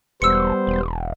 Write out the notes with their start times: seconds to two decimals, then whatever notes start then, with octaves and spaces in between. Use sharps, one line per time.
0.22 E1 G3 B3 C5 E6 C#7
0.67 E1